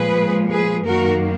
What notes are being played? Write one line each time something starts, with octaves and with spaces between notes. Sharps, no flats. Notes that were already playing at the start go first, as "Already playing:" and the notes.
Already playing: A#2 F3 G#3 G#4 B4
G#4 B4
F#2 D#3 A#3 F#4 A#4